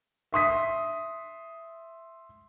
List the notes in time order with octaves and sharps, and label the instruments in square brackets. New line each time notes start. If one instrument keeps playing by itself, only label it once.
[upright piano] E5 C6 D#6 B6